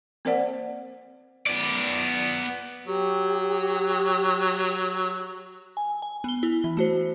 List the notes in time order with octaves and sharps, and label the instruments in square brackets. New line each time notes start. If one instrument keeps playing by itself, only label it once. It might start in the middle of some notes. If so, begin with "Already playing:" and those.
[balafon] A#3 C4 A#4 C5 D5 F#5
[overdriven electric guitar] B3 D5
[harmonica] F#3 [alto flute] G4
[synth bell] G#5
G#5
B3 G7
E4
E3
A3 F#4 C5